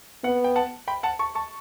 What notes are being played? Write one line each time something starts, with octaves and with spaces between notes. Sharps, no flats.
B3 F#5
G5
F#5 A5
G5 B5
F#5 A5
A5 C#6
A5 C#6